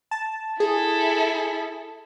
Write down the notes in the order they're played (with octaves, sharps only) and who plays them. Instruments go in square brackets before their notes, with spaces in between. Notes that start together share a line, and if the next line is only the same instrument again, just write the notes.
[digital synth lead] A5
[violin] E4 A4 [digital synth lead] G#4